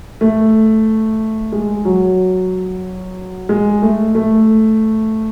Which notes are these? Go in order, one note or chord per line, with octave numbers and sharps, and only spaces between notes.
A3
G#3
F#3
G#3
A3
A3